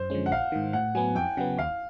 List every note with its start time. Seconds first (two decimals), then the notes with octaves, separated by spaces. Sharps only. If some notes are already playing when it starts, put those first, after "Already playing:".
Already playing: F#2 C5
0.10 D3 F3 G#3 C#4
0.26 F#5
0.31 A#1 F5
0.52 G#2 D#3
0.73 A2 F#5
0.95 F#3 B3 G#5
1.15 F2 G5
1.37 C#3 F#3 B3 F#5
1.58 D#2 F5